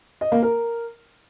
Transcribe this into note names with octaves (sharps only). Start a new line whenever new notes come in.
D#5
A#3
A#4